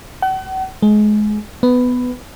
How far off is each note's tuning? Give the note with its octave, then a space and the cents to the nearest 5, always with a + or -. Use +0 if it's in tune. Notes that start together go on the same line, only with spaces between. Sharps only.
F#5 +40
G#3 +25
B3 +10